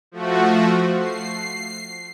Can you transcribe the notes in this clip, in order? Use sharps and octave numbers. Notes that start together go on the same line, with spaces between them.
F3 A3 F#4
C7